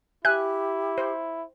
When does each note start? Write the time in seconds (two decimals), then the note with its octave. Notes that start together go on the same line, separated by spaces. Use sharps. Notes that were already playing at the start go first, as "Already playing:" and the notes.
0.25 E4 G4 E5 G#5 F#6
0.98 C5